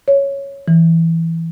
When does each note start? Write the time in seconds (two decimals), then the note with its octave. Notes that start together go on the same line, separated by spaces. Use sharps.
0.08 C#5
0.68 E3